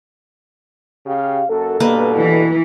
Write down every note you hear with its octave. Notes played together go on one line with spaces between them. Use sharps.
C#3 G4 F5
F#2 A#3 F#4 A4
G2 B2 A#3 B4
E3